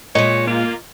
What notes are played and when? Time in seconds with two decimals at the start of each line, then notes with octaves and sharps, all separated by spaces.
0.15 A#2 G#3 C#5 D#5
0.47 A#3 F4